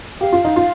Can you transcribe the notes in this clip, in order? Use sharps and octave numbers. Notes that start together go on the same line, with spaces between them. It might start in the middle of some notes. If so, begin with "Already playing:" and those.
G4 F5
F4
D#4
F4